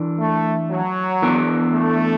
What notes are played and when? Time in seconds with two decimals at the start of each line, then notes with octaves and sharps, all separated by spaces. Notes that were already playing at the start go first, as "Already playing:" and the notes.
Already playing: E3 D4
0.19 A3
0.71 F#3
1.22 E3 B3 D4
1.74 A3